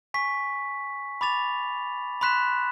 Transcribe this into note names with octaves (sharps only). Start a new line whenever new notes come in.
G#5 C#6 B6
B5 D6 A6 F7
B5 C6 F#6 B6 E7